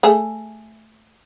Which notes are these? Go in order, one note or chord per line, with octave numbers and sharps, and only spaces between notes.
A3 G#4